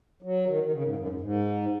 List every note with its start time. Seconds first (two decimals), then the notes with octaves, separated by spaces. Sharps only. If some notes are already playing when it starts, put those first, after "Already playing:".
0.22 F#3
0.47 D#3
0.63 D#3
0.72 C#3
0.83 G#2
0.97 F#2
1.09 G#2
1.21 G#2